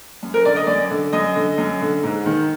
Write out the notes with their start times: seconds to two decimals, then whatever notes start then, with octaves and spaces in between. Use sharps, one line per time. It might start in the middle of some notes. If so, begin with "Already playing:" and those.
0.23 F#2
0.34 A#4
0.45 D3 D5
0.56 D#5
0.67 F#2 D5
0.90 D3
1.13 F#2 D#5
1.35 D3
1.58 F#2
1.81 D3
2.03 G#2
2.26 D#3